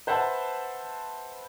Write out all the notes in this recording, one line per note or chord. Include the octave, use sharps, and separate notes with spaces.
B4 C5 E5 F#5 A5 B5